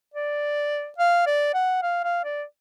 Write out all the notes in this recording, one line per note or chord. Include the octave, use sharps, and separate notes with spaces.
D5
F5
D5
F#5
F5
F5
D5